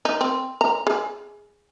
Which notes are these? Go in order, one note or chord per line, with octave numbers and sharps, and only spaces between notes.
D#4
C4
A#5
G#4